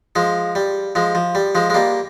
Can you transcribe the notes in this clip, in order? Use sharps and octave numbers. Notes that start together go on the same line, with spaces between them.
F3 G#3
G3
F3 G#3
F3
G3
F3 G#3
G#3
G3 A#3